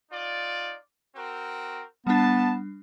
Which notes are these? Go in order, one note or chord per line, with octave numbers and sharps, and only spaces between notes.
D#4 F4 D5
C4 F#4 A#4
G3 B3 D4 A5